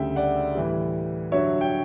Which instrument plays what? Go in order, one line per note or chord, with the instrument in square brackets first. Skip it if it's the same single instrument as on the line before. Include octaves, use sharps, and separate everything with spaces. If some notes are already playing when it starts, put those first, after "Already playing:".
Already playing: [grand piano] D2 C#3 G3 E5 G5
D5 F#5
A2 E3 G3
G2 D3 F#3 C#5 E5
G5